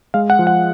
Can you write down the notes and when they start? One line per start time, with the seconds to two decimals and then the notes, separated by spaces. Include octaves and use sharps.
0.14 G#3 F5
0.30 F#5
0.39 F3
0.47 F#5